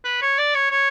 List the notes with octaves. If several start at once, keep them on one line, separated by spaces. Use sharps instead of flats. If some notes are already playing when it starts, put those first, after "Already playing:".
B4
C#5
D5
C#5
C#5